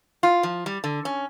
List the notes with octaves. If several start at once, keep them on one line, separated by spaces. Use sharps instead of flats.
F4
F3
G3
D3
C#4